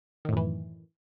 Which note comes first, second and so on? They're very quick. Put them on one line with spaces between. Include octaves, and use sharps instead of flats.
D#3 A2 F#2 E3